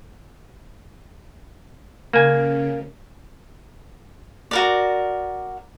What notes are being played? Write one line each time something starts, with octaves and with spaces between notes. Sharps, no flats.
C#3 A#3 G#5
F#4 A#4 D5